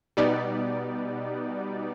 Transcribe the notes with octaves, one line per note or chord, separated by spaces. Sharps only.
B2 G3 B3 D#4 D5